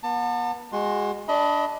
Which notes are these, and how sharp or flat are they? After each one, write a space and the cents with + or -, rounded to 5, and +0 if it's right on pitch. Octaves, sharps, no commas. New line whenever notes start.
B3 -40 A5 +30
G#3 -15 F#4 +0 C6 +25
D4 +0 D#5 +30 B5 +0